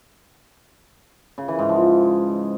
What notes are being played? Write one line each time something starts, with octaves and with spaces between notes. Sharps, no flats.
C#3
E3
G#2
F3